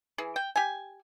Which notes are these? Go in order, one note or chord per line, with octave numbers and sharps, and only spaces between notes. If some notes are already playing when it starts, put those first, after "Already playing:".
E3 G#4
G5
G4 G#5